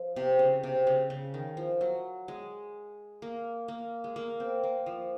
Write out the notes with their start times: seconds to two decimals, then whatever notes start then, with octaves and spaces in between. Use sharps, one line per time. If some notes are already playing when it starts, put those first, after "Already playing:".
Already playing: F3
0.16 C3
0.39 C#3
0.63 C3
0.87 C#3
1.10 C#3
1.34 D#3
1.57 F3
1.81 F#3
2.28 G#3
3.22 A#3
3.68 A#3
4.04 G#3
4.16 A#3
4.40 C4
4.64 A#3
4.86 F3